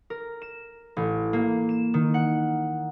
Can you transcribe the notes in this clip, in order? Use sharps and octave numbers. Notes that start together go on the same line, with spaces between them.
A#4
E7
A1
A#3
E7
D#3
F#5